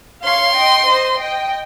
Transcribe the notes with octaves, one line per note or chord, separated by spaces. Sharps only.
C#5 F5 C6
D#5 G5
C5 D#5
D#5 G5